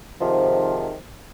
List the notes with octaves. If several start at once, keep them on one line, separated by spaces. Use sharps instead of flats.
G#2 C3 D#3 F3